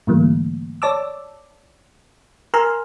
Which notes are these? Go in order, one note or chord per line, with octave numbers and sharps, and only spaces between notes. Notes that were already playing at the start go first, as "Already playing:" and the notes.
G#2 D3 E3 G3 A3 A#3
C#5 D5 A5 D6 E6
A#4 G#5 A#5 C6 E6 F6